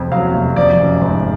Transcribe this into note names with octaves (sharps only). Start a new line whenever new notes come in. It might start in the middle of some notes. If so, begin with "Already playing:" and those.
Already playing: F1 F2
F#3 F5
F1
F3 D5
F#2
G#1